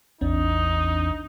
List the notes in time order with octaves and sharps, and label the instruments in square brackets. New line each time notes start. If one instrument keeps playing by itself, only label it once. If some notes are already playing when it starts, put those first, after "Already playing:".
[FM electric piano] A1 C4 D4 [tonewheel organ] E2 [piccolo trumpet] D#4